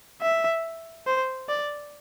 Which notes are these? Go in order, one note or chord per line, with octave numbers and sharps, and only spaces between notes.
E5
C5
D5